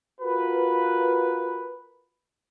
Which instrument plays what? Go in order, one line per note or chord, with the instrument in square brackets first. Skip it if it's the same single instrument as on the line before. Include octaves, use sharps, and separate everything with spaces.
[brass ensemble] F4 F#4 A#4 B4